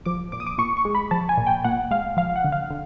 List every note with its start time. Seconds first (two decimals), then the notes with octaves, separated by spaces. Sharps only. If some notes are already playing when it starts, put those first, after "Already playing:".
0.05 F3 D6
0.32 A#2 D6
0.40 D#6
0.47 D6
0.58 A#2 C#6
0.77 C#6
0.85 G#3
0.95 B5
1.11 F3 A5
1.29 G#5
1.37 A#2
1.47 G5
1.64 A#2 F#5
1.91 G#3 F5
2.17 F3 F5
2.36 F#5
2.44 D3
2.52 F5
2.71 D3